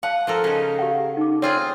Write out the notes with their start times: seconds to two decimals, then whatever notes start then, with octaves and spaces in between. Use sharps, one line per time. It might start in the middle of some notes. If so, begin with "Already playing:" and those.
0.03 F5 F#5 A5
0.27 F3 A4 A#4
0.44 C#3 D#4
0.79 G4 F5 F#5
1.17 D#4 D6
1.42 C4 F4 G#4 C#5